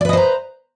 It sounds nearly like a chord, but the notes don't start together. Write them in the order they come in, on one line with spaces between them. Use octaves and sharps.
D5 B4 D#5 C5 A#5